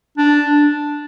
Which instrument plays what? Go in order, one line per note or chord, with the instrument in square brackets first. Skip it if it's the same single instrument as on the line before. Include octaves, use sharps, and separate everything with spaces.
[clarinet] D4